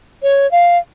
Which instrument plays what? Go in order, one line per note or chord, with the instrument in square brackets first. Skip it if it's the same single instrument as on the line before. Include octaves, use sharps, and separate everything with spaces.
[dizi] C#5
F5